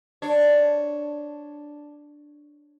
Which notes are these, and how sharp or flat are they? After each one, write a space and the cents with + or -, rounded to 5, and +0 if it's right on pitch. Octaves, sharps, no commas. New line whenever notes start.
D4 +0 C#5 +0